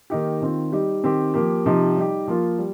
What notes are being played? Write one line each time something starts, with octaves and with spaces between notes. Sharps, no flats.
D#3 A#3 D#4 G4
D#3 C4 F4
G3 D#4 G4
D#3 C4 G4
F3 A#3 G4
C3 F3 D#4 G4
G3 D#4 G4
F3 A#3 F4
G3